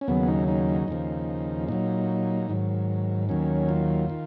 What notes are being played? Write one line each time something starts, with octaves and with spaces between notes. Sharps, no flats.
C#4
D#2 C#3 F#3 B3
D#4
D#4
D#2 C#3 F3
A#2 F#3 D#4
G#2 D#3 F#3
D#2 D#3 F#3 C#4
F4
D#3